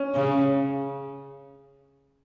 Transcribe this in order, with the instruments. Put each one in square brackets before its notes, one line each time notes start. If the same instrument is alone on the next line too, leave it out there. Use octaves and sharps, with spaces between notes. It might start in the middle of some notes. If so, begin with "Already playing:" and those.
Already playing: [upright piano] C#4
[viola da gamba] C#3